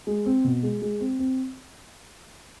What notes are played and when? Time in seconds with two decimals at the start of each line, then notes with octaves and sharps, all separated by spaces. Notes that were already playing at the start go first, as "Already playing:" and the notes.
0.07 G#3
0.26 C4
0.45 B2
0.63 G#3
0.82 G#3
1.01 C4
1.19 C4